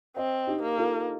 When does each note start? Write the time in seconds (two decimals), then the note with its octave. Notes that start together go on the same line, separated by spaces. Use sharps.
0.17 C4 C5 D#5
0.47 D#4 G4
0.62 A#3
0.78 F4 A4